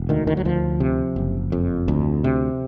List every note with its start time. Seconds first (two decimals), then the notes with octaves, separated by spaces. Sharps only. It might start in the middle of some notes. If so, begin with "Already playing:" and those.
Already playing: E1
0.09 D2 D#3
0.27 D#3
0.37 F#3
0.45 D2 F3
0.80 C3
1.16 F#1
1.52 F2
1.88 D2
2.24 C3